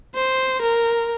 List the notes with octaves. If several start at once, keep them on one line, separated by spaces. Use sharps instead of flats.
C5
A#4